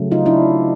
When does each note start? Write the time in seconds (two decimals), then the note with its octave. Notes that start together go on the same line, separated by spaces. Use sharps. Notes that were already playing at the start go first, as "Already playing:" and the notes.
Already playing: C#3 F#3 A3
0.11 D#4 F4
0.26 D4 E4